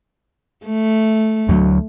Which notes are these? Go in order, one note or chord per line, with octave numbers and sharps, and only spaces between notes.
A3
D2 F#3